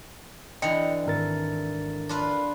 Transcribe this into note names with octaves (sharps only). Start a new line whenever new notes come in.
D3 E3 D#5 G5 C#7
G#1 A#4 A6
D4 F4 B4